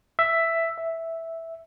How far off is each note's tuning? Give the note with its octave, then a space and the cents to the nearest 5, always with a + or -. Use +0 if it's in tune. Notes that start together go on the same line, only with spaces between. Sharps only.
E5 +5
E5 -5